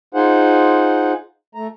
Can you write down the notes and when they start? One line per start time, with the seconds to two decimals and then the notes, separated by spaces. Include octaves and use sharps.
0.14 D#4 F4 G#4 C5 F#5
1.55 A3 A#5